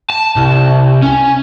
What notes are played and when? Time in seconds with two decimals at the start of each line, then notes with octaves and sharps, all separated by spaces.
0.10 A5
0.36 C2
1.03 C#4